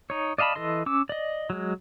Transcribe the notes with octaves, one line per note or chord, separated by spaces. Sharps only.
D#4 C#5
D5 D#5 F5 A5 B5
E3 A4 D#5 C6
C#4 D6 E6
D5 D#5
F#3 G#3